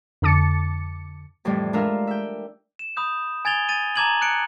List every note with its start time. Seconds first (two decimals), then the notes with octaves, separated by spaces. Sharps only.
0.22 F2 D3 A5 D6 A6 C#7
1.45 F2 A2 E3 G3
1.73 G#3 D4 F4 A#4 E5 F5
2.07 E5 G5
2.79 E7
2.97 B5 D#6 G6
3.45 G#5 G#6 A6 F7 G7
3.69 A6 D#7
3.96 A5 A#5 D6 G#6 D#7 F#7
4.21 F#6 C#7 D7